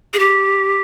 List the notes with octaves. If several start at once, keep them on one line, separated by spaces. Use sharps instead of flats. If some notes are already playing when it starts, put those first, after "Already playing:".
G#4
G4